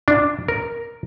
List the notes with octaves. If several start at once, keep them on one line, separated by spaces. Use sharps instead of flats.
D4
A#4